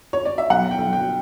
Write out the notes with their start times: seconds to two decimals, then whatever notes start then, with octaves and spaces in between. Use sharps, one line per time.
0.13 C#5
0.25 D5
0.38 E5
0.50 B1 F#5
0.71 G5
0.78 B1
0.93 G5